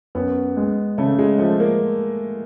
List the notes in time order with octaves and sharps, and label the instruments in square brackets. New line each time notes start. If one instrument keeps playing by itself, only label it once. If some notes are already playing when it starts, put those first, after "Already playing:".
[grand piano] F#2 [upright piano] B3
[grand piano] G#3
[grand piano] C#3 [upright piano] A3
[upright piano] G#3
[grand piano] F3 [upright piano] A3
[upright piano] A#3